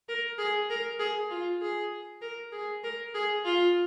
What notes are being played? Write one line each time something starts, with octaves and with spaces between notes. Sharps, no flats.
A#4
G#4
A#4
G#4
F4
G#4
A#4
G#4
A#4
G#4
F4